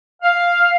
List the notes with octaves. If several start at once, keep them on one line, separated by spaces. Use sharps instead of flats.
F5